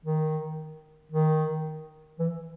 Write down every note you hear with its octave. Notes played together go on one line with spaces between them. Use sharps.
D#3
D#3
E3